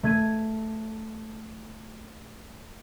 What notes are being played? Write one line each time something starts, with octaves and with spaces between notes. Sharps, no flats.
A3 G#6 D#7